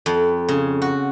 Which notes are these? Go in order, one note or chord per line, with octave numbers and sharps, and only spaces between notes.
F2
C#3
F#4